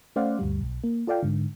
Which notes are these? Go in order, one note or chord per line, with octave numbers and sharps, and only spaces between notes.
A3 C#4 C5 D5 F5 F#5
D2 G2 G3
B1
A#3
F4 A4 D5 F5 G5
G#2 D3